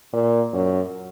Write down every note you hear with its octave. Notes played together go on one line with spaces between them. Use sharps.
A#2
F#2